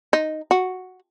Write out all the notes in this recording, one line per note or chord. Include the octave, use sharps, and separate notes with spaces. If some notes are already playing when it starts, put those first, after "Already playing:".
D#4
F#4